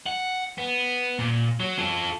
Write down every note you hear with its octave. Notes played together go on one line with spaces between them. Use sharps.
F#5
B3
A#2
F#3
F4 A4